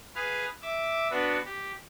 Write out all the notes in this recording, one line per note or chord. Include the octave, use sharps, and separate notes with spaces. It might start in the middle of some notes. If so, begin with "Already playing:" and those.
G#4 B4 F5
E5 D6
B3 D4 F#4 B4
G4